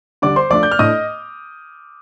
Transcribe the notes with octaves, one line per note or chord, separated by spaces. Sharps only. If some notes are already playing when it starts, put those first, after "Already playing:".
D3 G3 D4 D5 D6
C5 C6
F3 A3 D4 D5 D6
G6
F6
A2 A3 D4 D#5 D#6